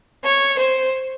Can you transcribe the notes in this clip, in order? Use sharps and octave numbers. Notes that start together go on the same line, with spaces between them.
C#5
C5